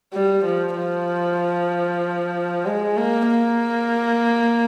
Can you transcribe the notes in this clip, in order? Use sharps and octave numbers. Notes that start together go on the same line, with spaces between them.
G3
F3
F3
G#3
A#3
A#3